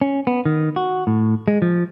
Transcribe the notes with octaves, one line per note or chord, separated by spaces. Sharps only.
C#4
B3
D#3
F#4
A2
G#3
F3